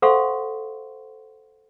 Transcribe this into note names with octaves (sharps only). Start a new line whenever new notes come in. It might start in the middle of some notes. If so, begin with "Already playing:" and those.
A4 C5 F5 F#5 C6 C#6